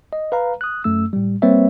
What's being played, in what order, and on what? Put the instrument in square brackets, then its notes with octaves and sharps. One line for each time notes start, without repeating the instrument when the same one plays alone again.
[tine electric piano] D#5
B4 F5 A#5
D#6 F#6
F#2 A3 E6
A2 G3
G3 A#3 C4 B4 C#5 E5